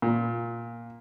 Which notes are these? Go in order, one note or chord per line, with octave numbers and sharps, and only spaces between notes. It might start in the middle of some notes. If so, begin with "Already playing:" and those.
A#2